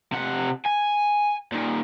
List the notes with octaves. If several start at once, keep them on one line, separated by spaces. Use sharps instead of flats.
C3 F#5
G#5
A#2 D#3